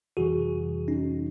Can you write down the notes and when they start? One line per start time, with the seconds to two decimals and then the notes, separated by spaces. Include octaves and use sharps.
0.17 F2 C3 E3 G3 F#4 G#4
0.88 C#4 D#4